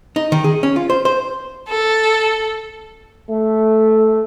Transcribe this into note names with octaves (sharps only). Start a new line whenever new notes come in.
D#4
D#3
G#4
C#4
F4
C5
C5
A4
A3